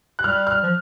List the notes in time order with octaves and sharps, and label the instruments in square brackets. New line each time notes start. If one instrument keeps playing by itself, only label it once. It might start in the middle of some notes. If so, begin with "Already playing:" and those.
[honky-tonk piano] F#6
[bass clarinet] G3 [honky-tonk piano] F6
[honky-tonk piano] F6
[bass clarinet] F3